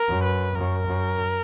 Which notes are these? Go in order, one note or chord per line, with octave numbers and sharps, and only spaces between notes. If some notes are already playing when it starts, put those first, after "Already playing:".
Already playing: A#4
F#2
B4
F#2 A#4
F#2